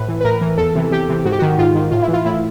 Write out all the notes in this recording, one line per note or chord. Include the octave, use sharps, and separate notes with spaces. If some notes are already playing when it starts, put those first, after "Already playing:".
Already playing: A2 B4
E3
B4
A2 A#4
E3
E2 A4
C3 E3
E2 G4
C3 E3
G#2 F#4
G4
D#3 F#4
G#2 F4
D#3
A2 F4
E4
E3
F4
A2 E4